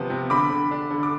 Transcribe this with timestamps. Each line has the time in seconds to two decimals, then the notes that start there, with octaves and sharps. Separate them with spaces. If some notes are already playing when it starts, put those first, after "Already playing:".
Already playing: C3 F3 B3
0.10 C3
0.30 D3 B5 D6
0.51 D3
0.71 D4
0.90 D3
1.03 D6